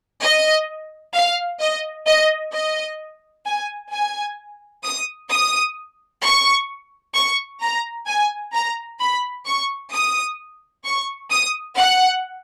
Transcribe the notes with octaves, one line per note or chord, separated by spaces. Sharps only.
D#5
F5
D#5
D#5
D#5
G#5
G#5
D#6
D#6
C#6
C#6
A#5
G#5
A#5
B5
C#6
D#6
C#6
D#6
F#5